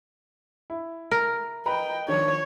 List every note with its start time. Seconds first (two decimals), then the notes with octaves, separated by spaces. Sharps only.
0.70 E4
1.11 A#4
1.66 B4 D#5 G5 A#5 B5
2.08 D#3 F3 D4 C#5